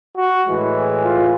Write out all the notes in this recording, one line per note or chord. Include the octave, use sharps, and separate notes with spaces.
F#4
A2 E3 G#3
F4